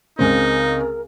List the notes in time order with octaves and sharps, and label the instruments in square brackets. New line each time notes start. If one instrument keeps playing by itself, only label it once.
[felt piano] C#2 C#3 C4 [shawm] D#4 [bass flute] A#4